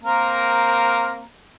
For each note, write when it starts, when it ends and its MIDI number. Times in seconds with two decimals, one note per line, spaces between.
0.03 1.25 58
0.03 1.25 60
0.03 1.25 70